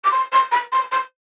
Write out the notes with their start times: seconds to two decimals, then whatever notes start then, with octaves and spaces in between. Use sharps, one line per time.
0.04 D6
0.11 C6
0.32 C6
0.51 B5
0.72 C6
0.91 C6